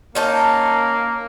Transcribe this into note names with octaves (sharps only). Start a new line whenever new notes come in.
A#3 C#4 D#4 A5